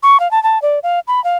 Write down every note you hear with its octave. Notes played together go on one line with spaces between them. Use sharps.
C#6
F5
A5
A5
D5
F5
B5
F5